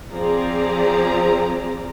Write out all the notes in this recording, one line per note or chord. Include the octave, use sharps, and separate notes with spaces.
F3 C4 G#4 D5 A#5